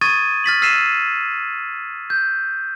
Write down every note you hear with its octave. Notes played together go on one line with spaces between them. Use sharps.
C#6 D#6 G#6 A6 D#7
F6 A6 B6 F#7
E6 F6 B6 C7 D#7 E7
G6